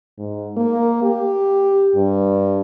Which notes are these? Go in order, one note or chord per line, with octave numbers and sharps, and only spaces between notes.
G#2
A#3
G4
G2